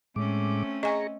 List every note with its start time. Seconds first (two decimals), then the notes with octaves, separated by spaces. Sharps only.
0.16 A2 G#3 A3 C4 C#4 D6
0.83 G#4 D#5 G#5 A#5 C#6